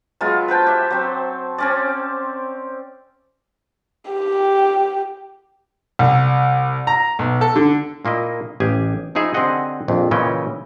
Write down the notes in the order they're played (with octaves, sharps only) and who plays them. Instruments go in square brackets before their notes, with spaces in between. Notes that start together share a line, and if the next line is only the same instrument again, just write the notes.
[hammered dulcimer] F#3 G#3 B3 F4
B4 C5 G5 A5
G4 E5
F#3 C4
C4 C#4 D5
[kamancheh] G4
[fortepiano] C2
A#5
B1
A4
D3
[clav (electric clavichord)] A#2 A#3 E4 D#5
A1 G4 G#4 G#5
F3 D#4 E4 G#4 E5
D3 C4 G4 G#4 D#5 F#5
A#1 F2
A#2 C#3 E3 C#4 D#5 G5